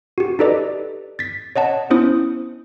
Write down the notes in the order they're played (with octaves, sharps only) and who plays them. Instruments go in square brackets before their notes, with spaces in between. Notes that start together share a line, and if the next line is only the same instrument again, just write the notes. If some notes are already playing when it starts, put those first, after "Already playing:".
[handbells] F#4 G4
D#4 G4 A4 B4 D5 D#5
A6 B6
C#5 D#5 F#5 A5
B3 C#4 E4 C5 D#6